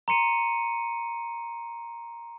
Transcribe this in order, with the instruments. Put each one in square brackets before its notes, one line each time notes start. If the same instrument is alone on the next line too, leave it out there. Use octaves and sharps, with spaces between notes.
[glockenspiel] A#5 C6 C#7 D#7